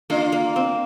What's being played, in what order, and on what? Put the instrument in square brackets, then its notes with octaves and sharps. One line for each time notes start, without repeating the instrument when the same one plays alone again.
[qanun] A#3 [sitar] D4 F4
[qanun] A#3
C4